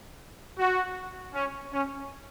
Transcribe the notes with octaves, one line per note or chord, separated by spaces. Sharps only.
F#4
C#4
C#4